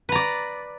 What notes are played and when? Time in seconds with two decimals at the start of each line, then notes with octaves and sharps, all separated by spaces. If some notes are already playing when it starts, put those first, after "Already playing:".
0.09 B4
0.12 A#5
0.15 D5